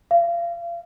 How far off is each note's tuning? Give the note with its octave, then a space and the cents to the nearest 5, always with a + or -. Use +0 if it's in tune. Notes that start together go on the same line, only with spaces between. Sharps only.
F5 -35